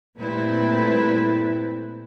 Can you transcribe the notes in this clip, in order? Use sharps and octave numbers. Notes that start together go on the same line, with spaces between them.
A#2 G3 A3 C4 E4 B4